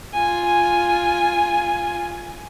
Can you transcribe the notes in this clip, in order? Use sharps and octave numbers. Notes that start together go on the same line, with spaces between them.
F4 G#5